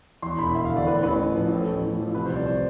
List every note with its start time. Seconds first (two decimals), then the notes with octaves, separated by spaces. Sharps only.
0.22 E2 C6
0.38 E1 B5
0.55 E1 E5
0.65 F5
0.70 D3
0.77 D5
0.87 A2 B4
1.03 A1 B4
1.19 A1
1.34 F3
1.51 A2 A4
1.67 A1
1.83 A1
1.99 F3
2.14 C3 B4
2.26 C5
2.30 C2
2.36 D5
2.47 C5